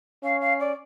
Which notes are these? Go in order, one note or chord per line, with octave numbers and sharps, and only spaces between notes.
C#4 F5
F5
D5